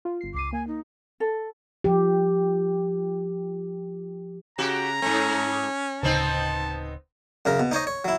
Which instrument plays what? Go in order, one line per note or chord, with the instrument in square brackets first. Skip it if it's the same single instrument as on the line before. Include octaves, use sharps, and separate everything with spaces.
[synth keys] F4
G1 C7
[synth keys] C#2 C7 D#7 [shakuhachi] D6
[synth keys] A#3 [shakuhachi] G#5
[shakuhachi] D#4
[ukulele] A4
[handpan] F3 G4
[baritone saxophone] C#3 [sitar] F#4 G4 [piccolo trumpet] A#5
[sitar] G#2 A3 [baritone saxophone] C#4
[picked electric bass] D1 C#3 [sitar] B3 C4 D#4 [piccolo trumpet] A5
[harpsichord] F#2 C#3 A#4
B2
D#4 C5 C#5 D#5
C#5
F#3 E4